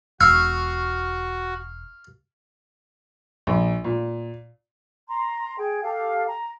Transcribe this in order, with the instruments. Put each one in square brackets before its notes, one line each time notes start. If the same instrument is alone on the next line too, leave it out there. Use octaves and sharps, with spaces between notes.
[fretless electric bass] E1 [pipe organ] F#4 [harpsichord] F5 C#6 [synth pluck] E6
[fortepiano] A#1
A#2
[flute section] A#5 C6
G#4 G5
G4 A4 F5
A#5